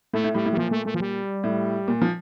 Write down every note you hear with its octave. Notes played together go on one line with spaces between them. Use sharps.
A2 A3
A2
A2 G3
A2
G3
A#2 F3
A3
A3
F3
G3
A2
A#2
F3